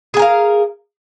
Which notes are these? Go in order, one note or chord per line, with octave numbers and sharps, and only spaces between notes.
G#4 A#4 F5 G#5